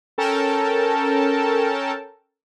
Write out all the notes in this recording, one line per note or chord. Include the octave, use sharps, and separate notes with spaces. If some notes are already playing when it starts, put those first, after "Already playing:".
C#4 A4 A#4 G5 A5